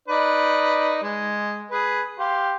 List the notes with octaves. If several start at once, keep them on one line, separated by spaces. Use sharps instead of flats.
D#4 B4 D5
G#3
G#4 B4
G4 F5 C6